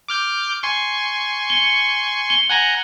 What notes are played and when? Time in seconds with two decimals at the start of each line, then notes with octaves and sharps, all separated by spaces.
0.08 D6 F6 G6
0.63 G#5 C6 C#6
1.50 C#7 G7
2.30 G7
2.50 F#5 G#5 A#5 F#7